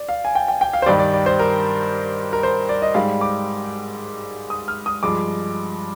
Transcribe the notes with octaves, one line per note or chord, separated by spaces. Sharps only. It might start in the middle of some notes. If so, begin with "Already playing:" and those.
Already playing: D5
F5
G#5
G5
G5
G5
F5
C5
G2 D#3 G3 D5
D5
D5
C5
A#4
A#4
C5
D5
D#5
G#2 G3 F5
D6
D#6
F6
D#6
G2 F3 G#3 D6